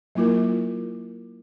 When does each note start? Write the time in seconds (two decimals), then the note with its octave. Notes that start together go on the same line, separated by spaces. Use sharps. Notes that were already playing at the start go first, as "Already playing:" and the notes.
0.15 F#3 A#3 E4 F4 A#4